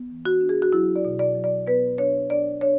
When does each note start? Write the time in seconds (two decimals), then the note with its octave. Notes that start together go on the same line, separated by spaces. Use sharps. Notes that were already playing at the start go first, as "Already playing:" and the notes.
Already playing: B3
0.10 E3
0.25 F#4
0.41 D4
0.49 G#4
0.62 F#4
0.73 F#3 E4
0.96 D5
1.05 B2
1.19 D5
1.35 F#3
1.44 D5
1.67 B3 B4
1.98 D4 C#5
2.30 D4 D5
2.61 D4 C#5